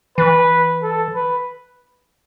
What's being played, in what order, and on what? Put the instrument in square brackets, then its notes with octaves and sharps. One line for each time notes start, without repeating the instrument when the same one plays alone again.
[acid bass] E3 [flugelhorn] B4
[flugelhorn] A4
B4